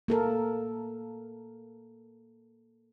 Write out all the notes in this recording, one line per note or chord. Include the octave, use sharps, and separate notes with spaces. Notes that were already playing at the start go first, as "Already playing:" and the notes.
A#3 A4 A#4